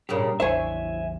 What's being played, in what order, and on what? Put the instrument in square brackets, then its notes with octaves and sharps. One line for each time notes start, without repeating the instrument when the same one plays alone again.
[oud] G2 A#2 C#3 [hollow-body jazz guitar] G4 A#4
[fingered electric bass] A1 E2 [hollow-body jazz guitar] D4 E4 [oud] C5 C#5 [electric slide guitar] E5 G#5